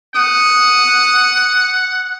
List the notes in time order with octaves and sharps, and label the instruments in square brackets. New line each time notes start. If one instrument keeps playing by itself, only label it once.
[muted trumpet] F#5 [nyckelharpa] D#6